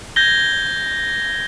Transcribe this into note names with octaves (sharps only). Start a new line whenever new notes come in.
G6 G#6 A#6 G7